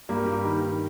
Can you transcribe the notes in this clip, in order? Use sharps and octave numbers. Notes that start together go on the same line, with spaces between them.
G2 G3 A#3
G2 G3
D#3
D#3